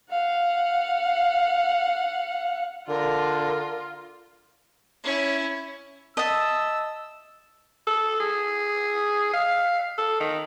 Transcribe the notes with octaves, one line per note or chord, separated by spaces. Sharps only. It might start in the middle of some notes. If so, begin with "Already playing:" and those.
F5 F#5
D3 F4 A#4
C#4 E4
D#5 E5 A5 D#6 E6 A6
A4
G#4
F5
A4
D#3